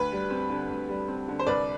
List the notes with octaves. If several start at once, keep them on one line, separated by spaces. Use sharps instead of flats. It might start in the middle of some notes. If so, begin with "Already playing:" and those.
Already playing: D2 B4
G3
C4
D3
D2
G3
C4
D3
C5
C2 B4 D5